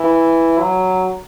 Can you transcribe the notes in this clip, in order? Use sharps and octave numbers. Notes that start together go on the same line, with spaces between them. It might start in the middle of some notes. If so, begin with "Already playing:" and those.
Already playing: E3
F#3